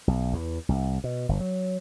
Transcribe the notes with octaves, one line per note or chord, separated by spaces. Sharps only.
B1
E2
C2
B2
G1
F#3